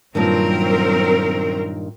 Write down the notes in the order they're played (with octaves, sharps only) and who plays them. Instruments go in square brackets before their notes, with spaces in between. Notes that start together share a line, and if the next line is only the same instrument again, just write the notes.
[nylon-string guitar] G2 A#2 D#3 [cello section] F#3 C4 A#4